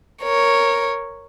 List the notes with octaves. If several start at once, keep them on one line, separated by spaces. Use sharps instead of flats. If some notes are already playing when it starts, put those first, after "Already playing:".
A#4 C#5